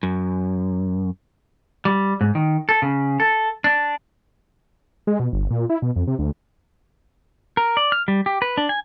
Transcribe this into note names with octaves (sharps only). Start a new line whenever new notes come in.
F#2
G3
G#2
D#3
A4
C#3
A4
D4
G#3
B2
G1
A#2
E4
B2
F2
C3
D2
A#4
D5
F6
G3
G4
B4
D4
G#5